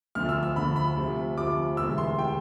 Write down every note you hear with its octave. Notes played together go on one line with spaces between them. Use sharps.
D2 D3 F3 F6
E6
E6
D2 D3 F3 B5
B5
D2 C3 F3
D2 C3 F3 D6
E1 D2 C3 E3 E6
C6
C3 E3 G5